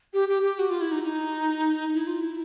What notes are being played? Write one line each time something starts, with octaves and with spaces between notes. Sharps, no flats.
G4
G4
G4
F#4
F4
E4
D#4
D#4
E4
F4
E4